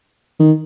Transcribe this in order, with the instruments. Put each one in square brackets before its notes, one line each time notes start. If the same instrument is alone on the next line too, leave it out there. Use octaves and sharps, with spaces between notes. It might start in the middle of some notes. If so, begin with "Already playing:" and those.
[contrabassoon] D#3